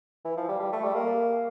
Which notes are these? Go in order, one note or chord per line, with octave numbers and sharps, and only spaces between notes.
E3
F3
G3
G3
A3
G3
A#3